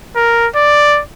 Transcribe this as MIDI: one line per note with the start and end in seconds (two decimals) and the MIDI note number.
0.16 0.47 70
0.56 1.01 74